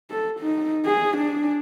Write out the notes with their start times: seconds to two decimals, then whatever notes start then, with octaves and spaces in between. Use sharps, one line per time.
0.10 A4
0.39 D#4
0.86 G#4
1.17 D4